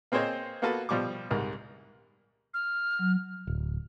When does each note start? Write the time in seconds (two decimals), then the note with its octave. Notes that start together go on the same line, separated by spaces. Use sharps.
0.12 A#3 C4 G#4 C5 C#5 D#5
0.62 A#3 B3 F4 F#4 A4 B4
0.89 B2 F3 G3 C#6 D6
1.31 C2 G#2 A#4
2.54 F6
2.99 F#3
3.47 D1